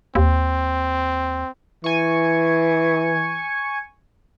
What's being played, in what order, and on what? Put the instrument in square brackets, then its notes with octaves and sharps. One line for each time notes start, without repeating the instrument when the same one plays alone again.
[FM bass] D#2 [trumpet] C4
[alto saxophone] E3 [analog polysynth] G#5 C#6